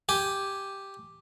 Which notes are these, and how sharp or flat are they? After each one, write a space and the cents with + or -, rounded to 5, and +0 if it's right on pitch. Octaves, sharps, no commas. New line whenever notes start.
G4 +0 G#5 +0